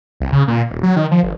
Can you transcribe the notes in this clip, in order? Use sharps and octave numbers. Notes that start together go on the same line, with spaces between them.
C2
C#3
A#2
D#1
F#3
D#3
F3
G1